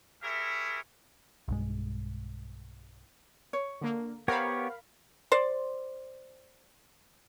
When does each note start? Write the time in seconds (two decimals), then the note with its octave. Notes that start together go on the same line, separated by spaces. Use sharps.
0.22 E4 G4 G#4 A#4 C#5 E5
1.48 B1 G2 G#3
3.53 C#5
3.81 D3 A#3
4.28 B3 G4 A#4 C5 C#5 F5 F#5 B5
5.32 C5 D5